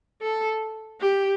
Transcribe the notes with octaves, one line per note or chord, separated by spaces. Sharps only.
A4
G4